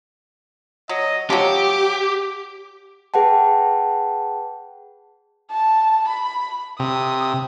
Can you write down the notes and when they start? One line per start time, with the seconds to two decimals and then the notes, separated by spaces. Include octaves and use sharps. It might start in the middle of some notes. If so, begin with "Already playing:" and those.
0.89 F#3 D#5
1.30 F3 F#3 G4 D6
3.14 G#4 B4 F#5 G5 A5
5.51 A5
6.09 B5
6.79 C3 D#6